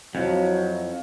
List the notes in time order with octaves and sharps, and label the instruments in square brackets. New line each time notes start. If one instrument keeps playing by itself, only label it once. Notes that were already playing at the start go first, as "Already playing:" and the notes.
[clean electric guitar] F2 [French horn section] F#3 E4